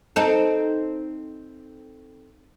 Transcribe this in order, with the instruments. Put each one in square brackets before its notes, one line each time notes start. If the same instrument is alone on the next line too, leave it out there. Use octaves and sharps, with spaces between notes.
[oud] C4 D#4 A4